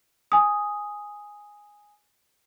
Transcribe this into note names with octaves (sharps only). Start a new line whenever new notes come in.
G#5 D#6